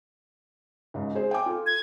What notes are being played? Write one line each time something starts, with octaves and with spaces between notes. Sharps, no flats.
C#2 G#2
G#4 C5
G5 G#5 D6
F4 A4
G#6